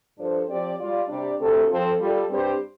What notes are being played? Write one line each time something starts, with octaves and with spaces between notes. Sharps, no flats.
G2 F3 D4 A4 C5
F3 C4 G4 D5
G3 F4 D5
C3 G3 D4 G4 D5
D2 C3 A3 C4 A4
F3 C4 F4 A4
G3 F4 A4
G2 G3 C4 G4 C5